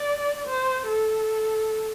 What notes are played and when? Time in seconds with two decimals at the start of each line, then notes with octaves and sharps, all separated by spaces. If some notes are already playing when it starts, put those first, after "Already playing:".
Already playing: D5
0.48 C5
0.87 A4